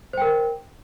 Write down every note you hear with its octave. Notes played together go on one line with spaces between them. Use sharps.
A#4 C5 G5